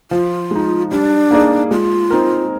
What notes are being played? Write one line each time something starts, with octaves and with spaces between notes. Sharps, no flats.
F3 F4
G#3 D#4
G3 D4
A#3 D#4 G#4 D5
G#3 F4
C4 D#4 A#4